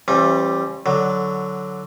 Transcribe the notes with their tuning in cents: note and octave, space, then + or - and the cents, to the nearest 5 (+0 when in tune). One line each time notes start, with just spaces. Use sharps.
E3 +35 G3 +0 C#4 -40
D3 +0 F#3 +0